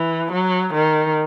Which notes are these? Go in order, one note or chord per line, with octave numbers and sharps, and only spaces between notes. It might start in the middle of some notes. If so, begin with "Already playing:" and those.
Already playing: E3
F#3
D#3